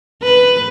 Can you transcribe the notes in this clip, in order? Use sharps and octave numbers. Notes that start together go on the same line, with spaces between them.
B4